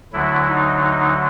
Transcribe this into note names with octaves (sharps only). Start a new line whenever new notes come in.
D2 D3 F#3 E4
D#4
D#4